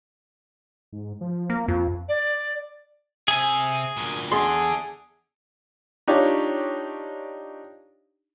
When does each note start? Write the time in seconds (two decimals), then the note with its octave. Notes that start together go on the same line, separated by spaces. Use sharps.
0.93 G#2
1.21 F3
1.50 A#3
1.68 F2 F4
2.08 D5
3.28 C3 G#4 E5 G#5
3.97 D2 A#2
4.32 E2 D4 G#4 A4 C6
6.07 D4 D#4 F4 G4 C#5